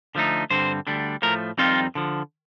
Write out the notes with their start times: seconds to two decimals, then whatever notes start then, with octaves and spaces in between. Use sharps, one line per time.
0.15 D3 F3 A3 D#4
0.50 G2 D3 G3 C4 C5
0.87 D2 D3 G3 D4
1.22 A2 F3 A3 A#4
1.58 F2 D#3 G3 C4 D#4 F4
1.95 D3 F3